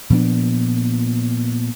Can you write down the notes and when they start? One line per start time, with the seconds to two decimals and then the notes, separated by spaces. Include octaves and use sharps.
0.10 A#2 F3 B3 D4